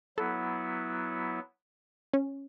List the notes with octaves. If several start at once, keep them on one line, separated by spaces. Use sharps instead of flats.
F#3 B3 E4 A4
C#4